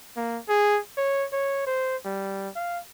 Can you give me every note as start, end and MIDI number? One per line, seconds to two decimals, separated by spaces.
0.17 0.39 58
0.49 0.80 68
0.97 1.26 73
1.33 1.65 73
1.67 1.96 72
2.05 2.49 55
2.55 2.79 77